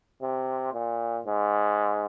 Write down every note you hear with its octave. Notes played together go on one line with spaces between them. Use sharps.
C3
A#2
G#2